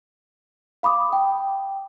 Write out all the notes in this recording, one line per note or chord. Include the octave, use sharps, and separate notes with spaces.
F5 B5 D6 D#6
G5